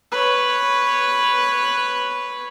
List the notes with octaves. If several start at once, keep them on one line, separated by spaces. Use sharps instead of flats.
B4 C#5